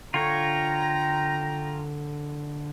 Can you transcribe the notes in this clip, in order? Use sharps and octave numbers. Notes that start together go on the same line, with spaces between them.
D3 F4 C#5 G5 A#5